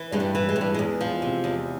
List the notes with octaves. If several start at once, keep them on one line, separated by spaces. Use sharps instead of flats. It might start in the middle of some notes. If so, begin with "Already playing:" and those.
Already playing: E3
G2 G#3
G3
E3
G#3
G2
G3
E2 G#3
F3
C3
E2